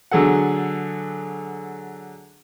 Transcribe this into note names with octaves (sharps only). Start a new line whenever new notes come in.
D3 F#3 G#4 A4 F#5